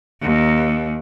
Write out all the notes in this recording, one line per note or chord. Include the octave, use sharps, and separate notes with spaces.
D#2